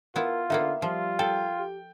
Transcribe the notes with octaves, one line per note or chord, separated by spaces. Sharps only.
B3 E4 F4 A#4
D3 A#3 B3 D#4 E5
F3 G3 F4
A4 G5
G4